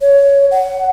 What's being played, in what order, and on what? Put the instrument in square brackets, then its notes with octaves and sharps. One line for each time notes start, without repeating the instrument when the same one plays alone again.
[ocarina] C#5
F#5